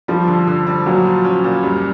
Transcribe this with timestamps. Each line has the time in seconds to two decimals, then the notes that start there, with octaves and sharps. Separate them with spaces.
0.08 F3 G3
0.28 D3
0.47 D3
0.67 G3
0.86 A#2 F#3
1.05 F3
1.25 C#4
1.44 A#2
1.63 F#2 G3